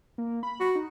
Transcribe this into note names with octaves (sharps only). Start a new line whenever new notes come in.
A#3
B5
F#4
D#4